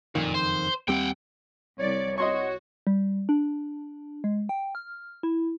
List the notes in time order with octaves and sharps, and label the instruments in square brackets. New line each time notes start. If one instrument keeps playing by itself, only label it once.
[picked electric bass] F#1 F2 D#3 [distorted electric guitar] A#2
[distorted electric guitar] C5
[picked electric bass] D#2 G3 C4 [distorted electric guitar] F#5 G5
[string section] C2 D5 [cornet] C#5
[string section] F#4 [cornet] C#5 [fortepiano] D#5 C6 C#6
[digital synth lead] G3
D4
G#3
G5
F6
E4